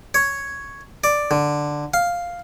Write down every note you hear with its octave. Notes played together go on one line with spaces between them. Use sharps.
C#5
D5
D3
F5